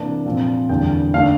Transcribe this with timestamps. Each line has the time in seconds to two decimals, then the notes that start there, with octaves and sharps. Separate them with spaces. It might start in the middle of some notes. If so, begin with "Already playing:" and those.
Already playing: C3 E3 A#3 D4 A5
0.26 A#2 F3 C4
0.69 E2 D3 G3 A#3 G5
1.14 D3 A3 D4 F5